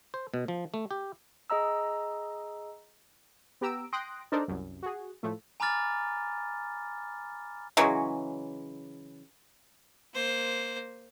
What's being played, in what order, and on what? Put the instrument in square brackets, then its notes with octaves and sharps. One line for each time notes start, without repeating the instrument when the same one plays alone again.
[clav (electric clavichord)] C5
B2
F3
A3
G4
[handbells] G#4 D#5 A#5 E6
[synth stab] B3 G4 A#5 E6 D7
G5 C6 D#6 F#6 A#6 D7
D4 D#4 A4 A#4 C5 D5
C2 F#2
F#4 G#4
A2 F3 A3
[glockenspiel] G#5 A#5 B5 D6 F6 A6
[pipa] C#3 E3 F#3 G#3
[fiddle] A#3 C5